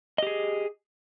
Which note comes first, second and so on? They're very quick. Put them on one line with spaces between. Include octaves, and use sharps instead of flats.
D#5 G4 G#4